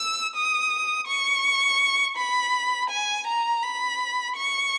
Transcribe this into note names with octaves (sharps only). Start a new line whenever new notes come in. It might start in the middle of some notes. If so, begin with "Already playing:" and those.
Already playing: E6
D#6
C#6
B5
G#5
A#5
B5
C#6